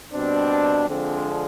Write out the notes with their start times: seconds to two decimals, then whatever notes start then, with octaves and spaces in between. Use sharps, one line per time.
0.13 B2 G3 C4 D4
0.87 D3 F3 G#3 C4 D4